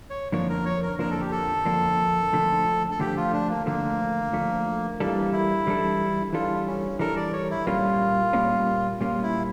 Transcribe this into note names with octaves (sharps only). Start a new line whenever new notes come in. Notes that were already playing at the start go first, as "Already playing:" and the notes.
C#5
F2 D3 F3 A#3 D4 C#5
A#4
C#5
A#4
F2 D3 F3 A#3 D4 A#4
A4
G4
A4
F2 D3 F3 A#3 D4
D2 D3 F3 A3
A4
D2 D3 F3 A3 G4
F4
D4
A#3
D2 D3 F3 A3 A#3
D2 D3 F3 A3
E3 G3 A#3 D4 A4
E4
E3 G3 D4 A4
E3 G3 D4 F4 A4
C#4
E3 G3 D4 A4 A#4
D5
C#5
E4
A#2 G3 A#3 C#4 F4
A#2 G3 A#3 C#4
A#2 G3 A#3 C#4 F4
E4